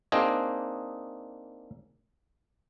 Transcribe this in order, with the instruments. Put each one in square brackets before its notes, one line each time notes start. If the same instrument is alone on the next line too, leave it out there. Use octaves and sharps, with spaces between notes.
[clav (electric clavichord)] A#3 C4 D4 D#4 G#4 D#5